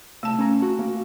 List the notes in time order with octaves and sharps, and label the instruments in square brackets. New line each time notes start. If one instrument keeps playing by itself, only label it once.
[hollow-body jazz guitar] C2 [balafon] A3 A5
[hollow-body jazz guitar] C#4 A#5
F#4
A#3